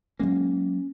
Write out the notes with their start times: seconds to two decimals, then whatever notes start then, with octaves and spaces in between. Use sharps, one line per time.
0.19 F#3 G#3 A#3 C#4